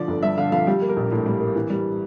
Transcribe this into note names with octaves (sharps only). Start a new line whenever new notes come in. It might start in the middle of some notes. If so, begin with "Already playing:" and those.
Already playing: D3 F3 D5
G1
G2 E5
D3 F5
F3 F5
G3 G4
A#3
A#4
A#1
A2
G3
A#3
E3
G3